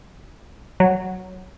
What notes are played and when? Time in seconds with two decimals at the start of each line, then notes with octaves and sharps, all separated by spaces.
0.80 F#3